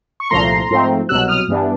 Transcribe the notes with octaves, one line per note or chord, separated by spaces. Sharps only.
C#6
C2 A#2 F3 A3 A#5 C6
G#2 F3 A3 C4
C2 B2 F#3 E6 F#6
D#6 F6
G2 E3 G3 B3 D4